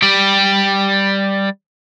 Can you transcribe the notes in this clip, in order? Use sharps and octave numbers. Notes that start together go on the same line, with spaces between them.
G3 G4